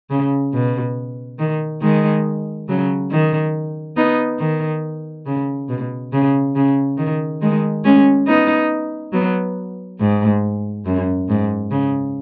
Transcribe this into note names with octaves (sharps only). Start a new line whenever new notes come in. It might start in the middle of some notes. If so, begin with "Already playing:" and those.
C#3
B2
D#3
D#3 G#3
C#3 F#3
D#3
B3 D#4
D#3
C#3
B2
C#3
C#3
D#3
D#3 G#3
G#3 C#4
B3 D#4
F#3 B3
G#2
F#2
G#2
C#3